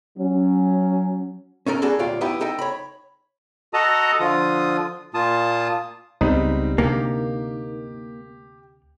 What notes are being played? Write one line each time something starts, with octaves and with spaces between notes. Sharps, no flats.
F#3 C#4
C#4 D#4 A4 A#4
B3 D#4 F#4 G#4 A4 D5
D2 A#2 F4 G4 C#5 D5
B3 D#4 E4 G4 G5
D#4 A4 D#5 G5
C#5 B5
F#4 A4 D#5 A5 A#5 D#6
D3 F3 F4 D#6
A#2 A#3 F4 A5 D#6
C#2 G3 B3 C4 D#4
D2 C3 A#3 G4